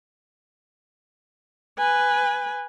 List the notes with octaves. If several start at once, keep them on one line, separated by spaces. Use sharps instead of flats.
B4 G#5